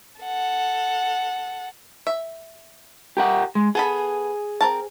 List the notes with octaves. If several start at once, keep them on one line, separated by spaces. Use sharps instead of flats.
A4 F#5
E5
G4 A#4 F#5
G#3
B3 G#4 A4 B5
C4 A#4 A5